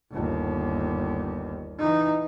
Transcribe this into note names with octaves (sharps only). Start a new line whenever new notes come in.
G1 D#2
E3 D#4